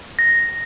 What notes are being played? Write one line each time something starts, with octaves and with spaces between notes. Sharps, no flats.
A#6